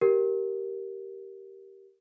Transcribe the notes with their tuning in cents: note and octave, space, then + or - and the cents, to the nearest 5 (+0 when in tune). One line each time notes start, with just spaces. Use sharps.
G4 -15 A#4 +0